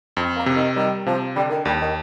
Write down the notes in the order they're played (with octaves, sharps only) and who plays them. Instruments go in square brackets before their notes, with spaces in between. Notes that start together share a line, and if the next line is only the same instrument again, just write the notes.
[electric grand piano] F2 [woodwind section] C4
[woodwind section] A#3
[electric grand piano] C3
[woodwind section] D#3
[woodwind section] D#3 [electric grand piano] G3
[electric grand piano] C3 [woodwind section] F3
[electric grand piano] D3 [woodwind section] G3
[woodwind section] D#3
[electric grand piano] D#2 [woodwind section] G3
[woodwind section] D#3